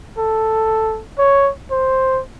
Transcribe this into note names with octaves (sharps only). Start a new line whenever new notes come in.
A4
C#5
C5